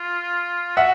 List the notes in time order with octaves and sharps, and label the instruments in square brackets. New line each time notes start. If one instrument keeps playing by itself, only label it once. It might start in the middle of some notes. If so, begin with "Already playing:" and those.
Already playing: [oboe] F4
[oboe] F#4 [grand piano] E5 F#5